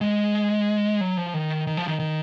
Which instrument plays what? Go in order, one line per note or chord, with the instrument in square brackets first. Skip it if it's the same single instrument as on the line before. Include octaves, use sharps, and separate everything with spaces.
[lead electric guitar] G#3
F#3
F3
D#3
D#3
F3
D#3
D#3